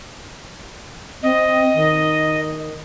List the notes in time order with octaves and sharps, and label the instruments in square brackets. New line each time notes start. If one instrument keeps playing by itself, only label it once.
[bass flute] C4 [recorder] D#5
[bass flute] D#3